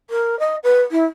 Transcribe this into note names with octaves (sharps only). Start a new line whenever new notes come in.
A#4
D#5
B4
E4